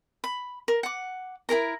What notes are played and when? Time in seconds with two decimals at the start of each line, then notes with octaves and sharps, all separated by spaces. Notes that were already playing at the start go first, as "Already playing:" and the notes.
0.24 B5
0.68 A#4
0.83 F#5 D6
1.49 E4 G#4 A#4 A#5